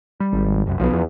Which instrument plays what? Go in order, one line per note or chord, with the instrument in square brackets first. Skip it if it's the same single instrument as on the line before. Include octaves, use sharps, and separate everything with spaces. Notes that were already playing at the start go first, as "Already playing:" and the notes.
[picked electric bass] G3
[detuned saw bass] G#1
[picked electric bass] F#1 C2 F#2
[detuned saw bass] B1 [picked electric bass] F3 G3 B3
[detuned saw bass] E2